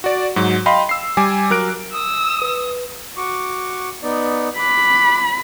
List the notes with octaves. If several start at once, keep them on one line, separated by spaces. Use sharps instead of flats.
F#4 D5
G#2 F#3
D#5 F5 G5 B5 C6
E6 C7
G3 G#5 D6
F#3 A#4 F#6 D7
D#6 E6
B4
F#4 C#6 D6
B3 D#4 D5
B5 D6 F#6